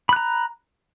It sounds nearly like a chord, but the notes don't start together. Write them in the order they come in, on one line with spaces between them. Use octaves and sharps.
B5 F#6 A#5